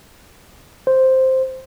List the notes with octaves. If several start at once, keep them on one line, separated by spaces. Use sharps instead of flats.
C5